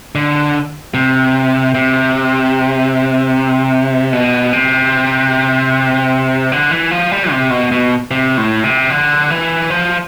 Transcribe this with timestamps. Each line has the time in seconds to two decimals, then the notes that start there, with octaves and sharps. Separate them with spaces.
0.15 D3
0.94 C3
1.75 C3
4.13 B2
4.53 C3
6.52 D3
6.71 E3
6.91 F3
7.11 G3
7.31 C3
7.50 B2
7.72 B2
8.11 C3
8.37 A2
8.64 C3
8.90 D3
9.30 E3
9.70 F3